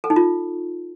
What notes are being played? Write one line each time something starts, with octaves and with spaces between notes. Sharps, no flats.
A4
D#4
F4